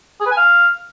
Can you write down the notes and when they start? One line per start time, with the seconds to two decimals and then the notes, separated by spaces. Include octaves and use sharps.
0.20 G#4
0.26 B4
0.31 G#5
0.37 F5